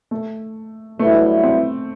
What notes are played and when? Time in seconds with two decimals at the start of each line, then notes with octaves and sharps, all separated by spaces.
0.11 A3
0.99 G2 F#3 A3 B3 E4
1.43 C4